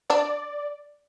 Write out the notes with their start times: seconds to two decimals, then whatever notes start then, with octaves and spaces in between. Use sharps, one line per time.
0.10 D4 D5